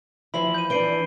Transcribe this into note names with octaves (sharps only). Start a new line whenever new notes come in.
E3 F3 E4 B5 F#7
G6 D#7
E3 D4 C7 D7 G7